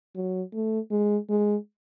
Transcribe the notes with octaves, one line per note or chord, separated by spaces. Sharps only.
F#3
A3
G#3
G#3